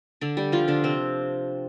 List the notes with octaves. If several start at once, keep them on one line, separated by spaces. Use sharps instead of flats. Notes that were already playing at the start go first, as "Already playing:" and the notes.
D3 D4
G3 G4
F3 F4
D3 D4
C3 C4